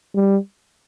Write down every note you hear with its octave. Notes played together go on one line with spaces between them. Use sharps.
G3